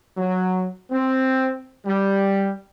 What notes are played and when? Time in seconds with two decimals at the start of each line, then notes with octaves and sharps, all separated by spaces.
0.17 F#3
0.91 C4
1.86 G3